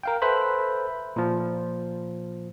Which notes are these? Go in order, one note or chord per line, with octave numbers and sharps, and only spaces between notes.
A#4 F5 G5
A4 B4 C5 E5 B5
A#2 F3